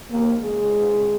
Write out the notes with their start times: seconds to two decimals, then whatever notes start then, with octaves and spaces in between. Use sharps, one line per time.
0.10 A#3
0.41 G#3